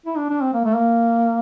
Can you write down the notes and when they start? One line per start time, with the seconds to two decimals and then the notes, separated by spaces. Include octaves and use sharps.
0.06 E4
0.17 D4
0.29 D4
0.42 C4
0.53 A#3
0.65 A3
0.75 A#3